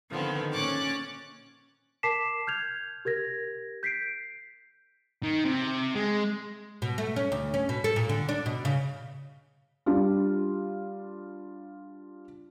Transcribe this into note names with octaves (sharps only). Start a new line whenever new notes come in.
D3 D#3 F3 B3 C4
A#2 C#4 C#5 D6 F#6 A6
A#4 A5 D6 B6 C7 E7
F6 G6 G#6 F7
G4 A#4 G#6 A#6
G6 B6 C7 D7
D#3
C3
G#3
B2
A3
C#4
D2
C#4
B2
A4
A#2
D3
D4
B2
C#3
G3 D4 F4